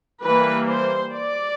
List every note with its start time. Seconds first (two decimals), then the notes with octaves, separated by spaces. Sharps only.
0.23 E3 G3 A#3 B4
0.68 C5
1.13 D5